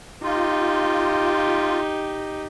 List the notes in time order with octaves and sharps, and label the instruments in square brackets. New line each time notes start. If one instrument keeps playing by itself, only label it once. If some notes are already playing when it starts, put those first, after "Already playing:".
[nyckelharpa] D#4 G4 [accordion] F4